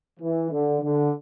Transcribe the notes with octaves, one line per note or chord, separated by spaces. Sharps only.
E3
D3
D3